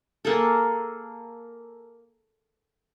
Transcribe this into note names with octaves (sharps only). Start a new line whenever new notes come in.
A#3 G#4 A4